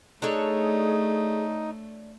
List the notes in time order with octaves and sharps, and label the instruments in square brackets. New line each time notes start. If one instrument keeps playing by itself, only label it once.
[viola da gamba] A3 [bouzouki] D4 A4 C#5 [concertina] D#4 [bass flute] G#4